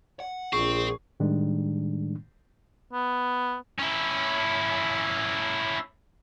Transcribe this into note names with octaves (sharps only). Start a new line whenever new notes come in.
F#5
A#1 C4 G#4 C#6
A2 D#3 G3 G#3 D4
B3
C#4 E4